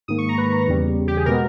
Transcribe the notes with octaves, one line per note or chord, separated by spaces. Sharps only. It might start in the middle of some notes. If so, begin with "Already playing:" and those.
G#2 D#3 A#3 D#6
C#6
A#5
B4
E2 C#3 G3
G4
G#4
B2 G#3 B3 A#4